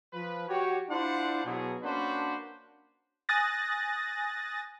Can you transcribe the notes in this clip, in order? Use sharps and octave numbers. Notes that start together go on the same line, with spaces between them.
F3 B4
F#4 G4 C#5
D4 E4 F4 C5 D5 F#5
B2 F#3 G#4
A#3 C#4 D4 F#4 B4 C5
G#5 D#6 F#6 A6 A#6